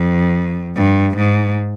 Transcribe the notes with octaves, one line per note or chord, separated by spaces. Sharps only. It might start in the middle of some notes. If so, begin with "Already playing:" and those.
Already playing: F2
G2
G#2